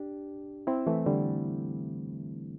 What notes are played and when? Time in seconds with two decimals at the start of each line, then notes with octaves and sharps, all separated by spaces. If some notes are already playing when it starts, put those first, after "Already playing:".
Already playing: D4 G4
0.67 C4 E4
0.87 E3 A3
1.06 D3 G3